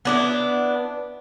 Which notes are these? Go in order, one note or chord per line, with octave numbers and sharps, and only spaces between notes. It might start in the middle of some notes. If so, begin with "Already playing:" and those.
B3 D4 E4